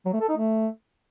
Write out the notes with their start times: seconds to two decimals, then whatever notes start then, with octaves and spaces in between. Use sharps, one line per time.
0.06 F#3
0.13 A3
0.21 A4
0.29 D#4
0.36 A3